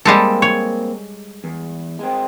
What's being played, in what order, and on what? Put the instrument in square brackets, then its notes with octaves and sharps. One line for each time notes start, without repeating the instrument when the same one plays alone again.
[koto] G3 G#3 A4 [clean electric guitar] A#3 C4
[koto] C#5
[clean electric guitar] E2
G#3 C4